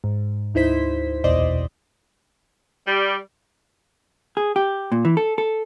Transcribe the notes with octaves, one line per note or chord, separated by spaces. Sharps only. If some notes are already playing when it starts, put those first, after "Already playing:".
G#2
D2 D#4 E4 C5 B6
A#1 E2 B2 C5 D5 D#5
G3
G#4
G4
A#2
E3
A4
A4